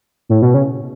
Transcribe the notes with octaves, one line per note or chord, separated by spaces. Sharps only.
A2
B2
C#3